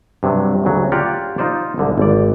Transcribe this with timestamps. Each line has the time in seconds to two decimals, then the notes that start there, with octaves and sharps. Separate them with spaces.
0.23 G2 C3 F#3
0.64 D2 C#3 F#3
0.92 F4 G4 D5 F5 F#5 A#5
1.38 D#4 F4 C5 D5
1.78 C2 G#2 D3
1.98 G#1 D5